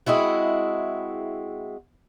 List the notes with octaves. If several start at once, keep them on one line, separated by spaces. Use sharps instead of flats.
G#3 C4 E4 F#4